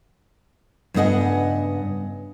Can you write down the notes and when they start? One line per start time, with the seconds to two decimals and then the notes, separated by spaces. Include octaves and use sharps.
0.94 G2 C#3 B3 D#5 F#5 G#5